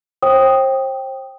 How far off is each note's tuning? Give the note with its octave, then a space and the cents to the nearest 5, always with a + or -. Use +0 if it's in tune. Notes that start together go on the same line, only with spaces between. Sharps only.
C5 +35 G5 +0 D#6 +0